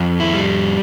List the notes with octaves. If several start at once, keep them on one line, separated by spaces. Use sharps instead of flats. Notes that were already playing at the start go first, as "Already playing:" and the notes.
Already playing: F2
E4
G3